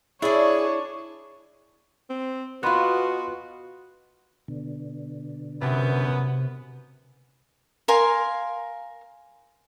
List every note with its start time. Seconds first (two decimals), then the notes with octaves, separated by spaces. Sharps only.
0.22 D4 E4 G#4 C#5 D5
2.10 C4
2.63 B2 B3 F4 F#4 B5 C6 F#6
4.48 B2 D3
5.61 F#2 C3 B3
7.88 A#4 F5 G#5 C6